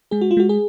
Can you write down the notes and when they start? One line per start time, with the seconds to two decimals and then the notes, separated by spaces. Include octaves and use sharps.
0.11 G#3 G#4
0.21 F#4
0.31 F4
0.37 G#3 F#4
0.49 G#4